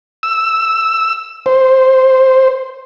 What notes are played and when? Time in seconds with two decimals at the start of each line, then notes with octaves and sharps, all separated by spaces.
0.23 E6
1.46 C5